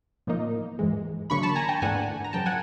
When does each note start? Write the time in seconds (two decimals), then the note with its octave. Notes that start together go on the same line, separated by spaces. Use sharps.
0.27 A2 F3 A#3 D#4
0.79 G#2 E3 G#3
1.30 D3 F#3 A#3 D4 B5 C#6
1.43 A5 B5
1.56 G#5 A#5
1.69 G5 A5
1.82 G#2 E3 A3 D4 F#5 G#5
2.24 A#5
2.33 F#2 C#3 F3 G5 A5
2.46 F#5 G#5